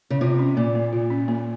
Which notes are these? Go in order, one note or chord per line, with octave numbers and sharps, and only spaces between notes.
C#3
C3 F4
C#4
A#2 A#3
A#3
F4
C#4
A#3